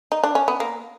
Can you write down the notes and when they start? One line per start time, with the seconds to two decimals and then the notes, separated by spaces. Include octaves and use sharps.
0.12 D#4
0.24 D4
0.35 C#4
0.48 B3
0.60 A#3